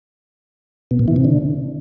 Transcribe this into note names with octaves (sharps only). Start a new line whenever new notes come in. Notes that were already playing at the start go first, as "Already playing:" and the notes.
B2
A#2
E3
C3
D3